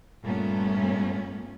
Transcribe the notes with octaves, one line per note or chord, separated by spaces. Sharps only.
G2 A#2 G3 A3 B3 C#4